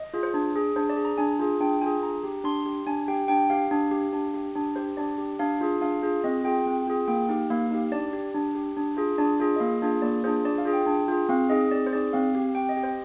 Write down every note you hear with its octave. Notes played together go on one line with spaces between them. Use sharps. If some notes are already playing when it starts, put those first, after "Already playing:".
Already playing: D#5
F4 G#4
C5
D4 D5
G#4
D4 C5
D5
G#4
A#5
D4 G#5
F4 G#4
D4 G5
F4 G#4 G#5
D4 A#5
G4
D4 C6
G4
D4 G#5
G4 G5
D4 G5
G4 F5
D4
G4
D4
G4
D4
G4 C5
D4 D5
G4
D4 F5
F4 G#4
D4 F5
F4 G#4
C4 D#5
F4 G#4 G5
C4
F4 G#4
A#3 G5
D#4 G4
A#3 F5
D#4 G4
D4 D5
G4
D4
G4
D4
F4 G#4
D4 D5
F4 G#4
D#5
A#3 F5
D4 F4 G#4
A#3 D5
D4 F4 G#4 C5
D4 D5
F5
F4 G#4
G5
D4
F4 G#4
C4 F5
D#4 G#4 D#5
C4 D5
C5
D#4 G#4 D5
C4 F5
G4
C4 G5
D#5
G4
C5